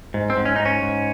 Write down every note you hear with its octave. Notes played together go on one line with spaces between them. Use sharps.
G#2
C4
G#2
C#4
G#2 D#4
C#4
G#2